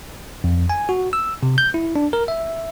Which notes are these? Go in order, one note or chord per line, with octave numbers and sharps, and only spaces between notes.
F2
G#5
F#4
E6
C3
G6
E4
D4
A#4
E5